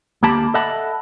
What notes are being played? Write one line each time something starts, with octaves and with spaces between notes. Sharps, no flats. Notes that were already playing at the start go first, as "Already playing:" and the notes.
D2 A#3 G4 A5 B5
A4 D#5 E5 F#5 A5 B5